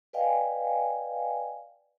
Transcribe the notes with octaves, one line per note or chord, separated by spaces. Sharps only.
B4 D5 D#5 F5 G5 G#5